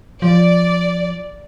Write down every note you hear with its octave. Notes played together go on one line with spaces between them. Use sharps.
F3 D5